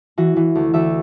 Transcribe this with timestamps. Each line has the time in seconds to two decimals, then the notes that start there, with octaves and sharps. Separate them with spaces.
0.18 E3 F#4
0.36 E3
0.55 D2
0.74 D2 E5